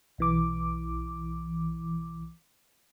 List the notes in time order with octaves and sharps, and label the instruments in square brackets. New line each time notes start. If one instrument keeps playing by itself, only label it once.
[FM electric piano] B1 E3 D6